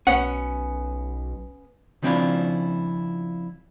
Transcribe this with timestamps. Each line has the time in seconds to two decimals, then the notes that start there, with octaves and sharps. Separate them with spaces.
0.07 B1 B3 C#4 F#5
2.03 C#3 F3 C4 D4 E4 F4